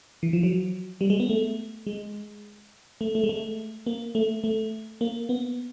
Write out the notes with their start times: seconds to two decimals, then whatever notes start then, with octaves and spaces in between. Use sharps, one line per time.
0.23 E3
0.33 F3
0.43 F#3
1.01 G3
1.10 G#3
1.20 B3
1.29 A3
1.87 G#3
3.01 A3
3.15 A3
3.23 G#3
3.29 A3
3.86 A#3
4.15 A3
4.44 A3
5.01 A#3
5.29 B3